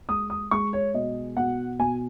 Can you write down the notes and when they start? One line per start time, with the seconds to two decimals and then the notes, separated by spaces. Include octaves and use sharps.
0.09 G#3 D#6
0.30 D#6
0.51 G#3 C#6
0.73 C#5
0.94 B2 D#5
1.37 B2 F#5
1.79 B2 G#5